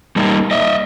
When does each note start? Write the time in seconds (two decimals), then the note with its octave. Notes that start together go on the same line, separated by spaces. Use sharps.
0.16 G3 A#3 D#4
0.51 D#5 E5